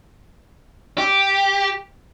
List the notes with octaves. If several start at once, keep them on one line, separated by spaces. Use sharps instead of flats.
G4